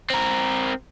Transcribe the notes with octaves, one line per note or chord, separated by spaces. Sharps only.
C4 A#4